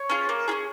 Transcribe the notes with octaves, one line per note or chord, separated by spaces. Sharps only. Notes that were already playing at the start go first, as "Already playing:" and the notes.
Already playing: C#5
C#4 F4 G#4
A#3
C#4 F4 G#4